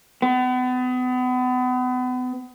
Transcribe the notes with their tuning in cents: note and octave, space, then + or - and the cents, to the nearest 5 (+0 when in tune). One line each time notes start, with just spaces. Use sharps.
B3 +35